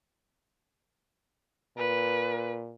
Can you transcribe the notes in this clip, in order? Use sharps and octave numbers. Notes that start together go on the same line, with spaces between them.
A#2 B4